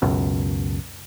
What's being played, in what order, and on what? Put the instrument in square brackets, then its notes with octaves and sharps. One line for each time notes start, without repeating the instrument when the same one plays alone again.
[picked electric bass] C#2 F#2 B2